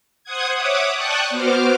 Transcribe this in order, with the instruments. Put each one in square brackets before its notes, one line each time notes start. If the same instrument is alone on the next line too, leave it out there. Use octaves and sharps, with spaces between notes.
[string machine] C5 F#5 D#6 G#6
C#5 E5 F#5 D6 D#6
D5 G5 A5 C#6 D#6 F#6
B3 F#4 C5 D6 F6